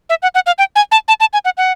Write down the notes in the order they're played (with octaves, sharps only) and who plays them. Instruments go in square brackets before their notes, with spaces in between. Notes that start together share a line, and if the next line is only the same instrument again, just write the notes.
[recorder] E5
F#5
F#5
F5
G5
G#5
A5
A5
A5
G#5
F#5
F#5